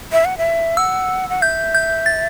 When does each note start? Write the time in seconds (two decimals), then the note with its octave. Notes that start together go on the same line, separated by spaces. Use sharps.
0.12 E5
0.25 F#5
0.38 E5
0.77 F#5 E6
1.29 F#5
1.42 E5 G6
1.75 G6
2.06 A6